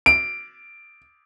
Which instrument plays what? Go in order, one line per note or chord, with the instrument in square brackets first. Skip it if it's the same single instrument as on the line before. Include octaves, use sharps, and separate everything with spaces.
[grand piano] D7